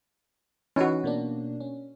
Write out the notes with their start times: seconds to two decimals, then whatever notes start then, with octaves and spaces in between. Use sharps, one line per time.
0.76 E3 C#4 D#4 F#4 B4
1.04 B2 A#3 D4
1.60 C#4